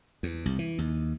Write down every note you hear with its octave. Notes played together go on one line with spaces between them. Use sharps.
E2
C2
E3
D#2